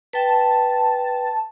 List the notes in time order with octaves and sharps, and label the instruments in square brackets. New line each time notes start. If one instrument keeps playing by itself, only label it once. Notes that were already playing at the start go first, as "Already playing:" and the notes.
[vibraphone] B4 G5 [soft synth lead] A5